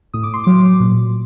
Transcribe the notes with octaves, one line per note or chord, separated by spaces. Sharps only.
A2 D#6
D6
C6
F#3 D6
A#2